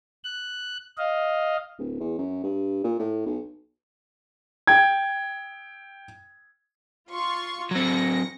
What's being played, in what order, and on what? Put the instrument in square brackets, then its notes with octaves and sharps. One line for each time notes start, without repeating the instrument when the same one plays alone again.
[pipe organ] F#6
D#5 F5
[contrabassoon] D1
E2
F#2
G2
A#2
A2
B1
[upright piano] G5 G#6
[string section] F4 C6 C#6
[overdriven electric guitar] F#3 C4 [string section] A#6 C#7